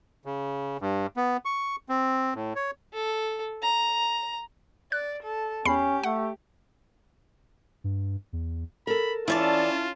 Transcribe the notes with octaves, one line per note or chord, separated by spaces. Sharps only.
C#3
G2
B3
C#6
C4
A2
C#5
A4
A#5
D5 F#6
A4
E2 C#4 G4 B5 C7
A3 F#5
G2
E2
A4 A#4 B5
E3 C#4 E4 F4 C#5 D5 A5